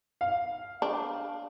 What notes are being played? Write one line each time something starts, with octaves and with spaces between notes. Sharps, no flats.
F5
D4